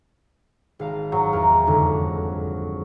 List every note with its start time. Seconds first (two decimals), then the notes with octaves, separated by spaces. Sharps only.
0.79 G#1 F5 A#5
1.12 G#2 F#3
1.33 E2 A#4
1.67 F2 G#2 D3